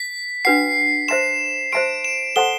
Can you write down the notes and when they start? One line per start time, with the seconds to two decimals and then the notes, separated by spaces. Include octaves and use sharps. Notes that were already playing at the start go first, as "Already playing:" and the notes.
Already playing: B6
0.45 D4 F#4 B4 F#5 C7
1.08 C5 E5 A5 C6 E7
1.72 C5 E5 A5 C6 D7
2.04 E7
2.36 A4 C5 F#5 A5 C6 G7